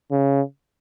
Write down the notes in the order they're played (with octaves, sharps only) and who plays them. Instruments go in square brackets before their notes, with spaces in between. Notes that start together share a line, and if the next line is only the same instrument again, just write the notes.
[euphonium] C#3